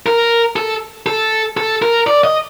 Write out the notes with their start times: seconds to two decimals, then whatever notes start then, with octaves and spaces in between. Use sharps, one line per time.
0.06 A#4
0.56 A4
1.06 A4
1.57 A4
1.82 A#4
2.07 D5
2.24 D#5